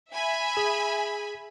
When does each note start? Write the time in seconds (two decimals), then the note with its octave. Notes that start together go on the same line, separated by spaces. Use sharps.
0.11 E5 G#5 B5
0.57 G#4